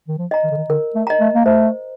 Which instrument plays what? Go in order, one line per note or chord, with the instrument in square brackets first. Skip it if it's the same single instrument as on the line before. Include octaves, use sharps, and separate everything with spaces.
[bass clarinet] D#3
F3
[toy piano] D#5 A#5
[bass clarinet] D#3
D3
D#3
[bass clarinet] D3 [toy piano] A#4
[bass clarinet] A3
[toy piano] D#5 A#5
[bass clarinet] A3
A#3
[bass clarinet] A3 [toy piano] C5